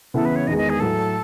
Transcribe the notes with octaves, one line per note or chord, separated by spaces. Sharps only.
C#3 E3 B3 E4 A4
B4
C#5
E2 D#3 G#3 D#5
D#5
G#4
A2 F#3 A3 A4